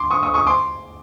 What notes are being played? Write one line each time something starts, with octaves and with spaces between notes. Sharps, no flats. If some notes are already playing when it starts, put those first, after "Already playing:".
Already playing: C6 D6
C#6 D#6
C#6 D#6
C#6 D#6
C6 D6